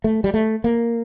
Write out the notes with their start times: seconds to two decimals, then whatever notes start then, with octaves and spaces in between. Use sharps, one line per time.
0.04 A3
0.24 G3
0.34 A3
0.64 A#3